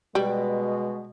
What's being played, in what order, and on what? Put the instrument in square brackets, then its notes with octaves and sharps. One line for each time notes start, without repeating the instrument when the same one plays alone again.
[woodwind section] B2 [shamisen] G3 [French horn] G#3